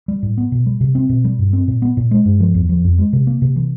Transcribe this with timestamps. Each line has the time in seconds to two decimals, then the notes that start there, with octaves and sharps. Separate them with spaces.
0.08 G3
0.23 A2
0.37 B3
0.52 B2
0.66 G3
0.81 C3
0.95 C4
1.09 B2
1.24 G3
1.39 G2
1.53 C4
1.68 A#2
1.82 B3
1.97 A#2
2.11 G#3
2.25 G2
2.40 F3
2.54 E2
2.69 F3
2.84 F2
2.98 G#3
3.13 C3
3.27 A#3
3.42 C3
3.56 E3